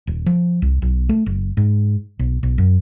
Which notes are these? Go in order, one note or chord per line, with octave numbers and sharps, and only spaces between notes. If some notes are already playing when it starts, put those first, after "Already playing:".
D#1
F3
C2
B1
A3
F#1
G#2
B1
B1
F#2